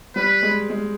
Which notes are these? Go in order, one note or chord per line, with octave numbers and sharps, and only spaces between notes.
G3 B4
G#3
G#3